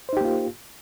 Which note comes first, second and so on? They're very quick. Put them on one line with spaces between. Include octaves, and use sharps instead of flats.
C5 D#4 G4 A#3 F4